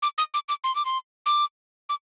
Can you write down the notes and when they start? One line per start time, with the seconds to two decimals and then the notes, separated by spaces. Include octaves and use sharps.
0.02 D6
0.18 D#6
0.34 D6
0.49 D6
0.64 C6
0.75 D6
0.85 C6
1.26 D6
1.89 D6